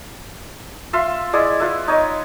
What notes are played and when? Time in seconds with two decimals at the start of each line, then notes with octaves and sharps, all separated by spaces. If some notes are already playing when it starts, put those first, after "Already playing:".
0.93 F4 E5 F5 C6
1.33 G#3 E4 D5
1.60 F4 B4 E5
1.88 D#4 C#5 D#5